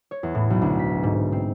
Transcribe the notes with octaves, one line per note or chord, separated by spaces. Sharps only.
C#5
E2
A2
B1
D2
B6
G#2
C4